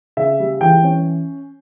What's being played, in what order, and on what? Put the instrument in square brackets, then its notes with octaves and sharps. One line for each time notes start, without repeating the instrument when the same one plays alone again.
[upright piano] C#3 E5
G3
E3 G5
C#4